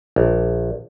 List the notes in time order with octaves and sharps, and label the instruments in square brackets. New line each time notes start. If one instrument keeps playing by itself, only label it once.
[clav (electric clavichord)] A#1